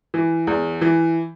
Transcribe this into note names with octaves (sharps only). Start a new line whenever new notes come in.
E3
E2
E3